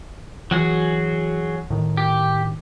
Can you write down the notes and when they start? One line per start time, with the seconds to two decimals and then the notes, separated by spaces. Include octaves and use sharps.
0.51 E3 F#3 F#4 G#4
1.70 A2 D#3
1.97 G4